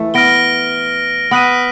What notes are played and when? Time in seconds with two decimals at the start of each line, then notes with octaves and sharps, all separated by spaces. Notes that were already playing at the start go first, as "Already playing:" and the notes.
Already playing: E3 A3
0.14 B3 F6 A#6 D7 G7
1.31 B3 D#6 F#6 B6 D#7